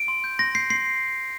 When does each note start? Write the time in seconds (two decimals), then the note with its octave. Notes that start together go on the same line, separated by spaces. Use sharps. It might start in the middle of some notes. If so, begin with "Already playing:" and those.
Already playing: D7
0.08 C6
0.24 G6
0.39 C6 A#6
0.55 G6 C7
0.70 C6 C7